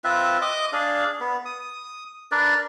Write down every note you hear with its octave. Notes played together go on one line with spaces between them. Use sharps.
C4 F4 B4 E5
D#5 D6 D#6
D4 G#4 F5
B3
D#6
D4 A#4 B4 D5